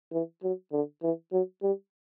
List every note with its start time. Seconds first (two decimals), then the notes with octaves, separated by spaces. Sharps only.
0.12 E3
0.43 F#3
0.72 D3
1.03 E3
1.32 F#3
1.62 G3